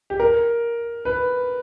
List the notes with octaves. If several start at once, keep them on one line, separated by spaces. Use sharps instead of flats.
G4
A#4
B4